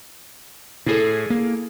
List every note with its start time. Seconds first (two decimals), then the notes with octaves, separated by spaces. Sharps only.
0.86 A2 E4 G#4 A4
1.30 A#3